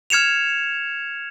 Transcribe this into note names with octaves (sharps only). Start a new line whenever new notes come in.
F6 G#6 C#7 E7 F7